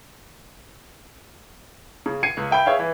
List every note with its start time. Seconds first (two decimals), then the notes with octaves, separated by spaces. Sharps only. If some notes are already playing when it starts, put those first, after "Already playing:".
2.06 C#3
2.23 G#6 C7 C#7 D#7
2.37 C#2
2.51 E5 G5 B5
2.66 G#4 C#5 E5 F5
2.79 E3